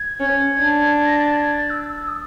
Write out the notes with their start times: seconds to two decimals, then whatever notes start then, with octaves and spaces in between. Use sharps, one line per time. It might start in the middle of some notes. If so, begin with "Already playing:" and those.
Already playing: G#6
0.20 C#4
0.57 D4
1.05 A#6
1.19 A6
1.32 G#6
1.51 A6
1.70 E6
1.89 E6
2.08 D#6